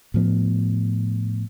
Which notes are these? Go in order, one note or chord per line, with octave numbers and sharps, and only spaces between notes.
A2 F3 B3